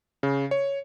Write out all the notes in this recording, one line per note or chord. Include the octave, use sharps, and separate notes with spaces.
C#3
C#5